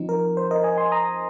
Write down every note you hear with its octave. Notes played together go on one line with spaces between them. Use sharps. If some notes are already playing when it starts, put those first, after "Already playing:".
Already playing: F3 C4 D#4
A#4
C5
A#4 D#5
D#5 G#5
G#5 C6
A#5 D#6